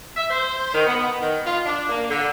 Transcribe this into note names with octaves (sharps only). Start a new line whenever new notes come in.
E5
C5
D#3
B3
D#3
F4
D4
A#3
D3